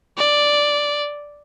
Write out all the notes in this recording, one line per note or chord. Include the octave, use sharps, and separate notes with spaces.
D5